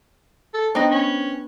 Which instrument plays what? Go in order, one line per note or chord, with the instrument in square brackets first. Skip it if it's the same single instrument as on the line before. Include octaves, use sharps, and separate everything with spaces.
[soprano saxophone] A4
[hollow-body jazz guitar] B3 D4 C#5 [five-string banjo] C4 D#5 [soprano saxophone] D#4
[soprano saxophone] C#4